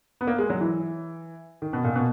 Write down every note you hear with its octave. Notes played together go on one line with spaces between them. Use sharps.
B3
A#3
G#3
F#3
E3
D#3
B2
A#2
B2